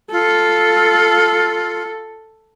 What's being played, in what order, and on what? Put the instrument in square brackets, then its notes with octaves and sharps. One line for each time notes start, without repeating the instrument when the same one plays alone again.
[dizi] F4 [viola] A4